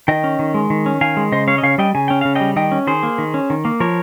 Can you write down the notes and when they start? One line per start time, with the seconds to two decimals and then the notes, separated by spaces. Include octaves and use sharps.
0.08 D#3 D#5 G5
0.24 C#4
0.39 D#3
0.54 G#3
0.70 D#3
0.86 C#4
1.01 D#3 F5 G#5
1.17 G#3
1.32 C#3 C5 D#5
1.48 C#4 C#5 F5
1.58 D#5
1.63 C#3 C#5 F5
1.78 G3 D#5 G5
1.95 C#3 G#5
2.08 C#4 G5
2.21 C#3 F5
2.36 G3 D#5 G5
2.56 D#3 D#5 G5
2.72 C#4
2.87 D#3 G#4 C5
3.03 A#3
3.18 D#3
3.34 C#4
3.50 D#3
3.65 A#3
3.80 F3 A#4 C#5